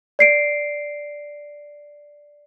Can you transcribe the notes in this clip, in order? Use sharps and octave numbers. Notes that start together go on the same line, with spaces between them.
D5 C7 D7